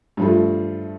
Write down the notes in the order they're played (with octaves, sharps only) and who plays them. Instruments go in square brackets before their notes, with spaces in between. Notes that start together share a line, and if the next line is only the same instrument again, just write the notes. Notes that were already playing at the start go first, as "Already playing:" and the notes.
[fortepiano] G2 F3 A3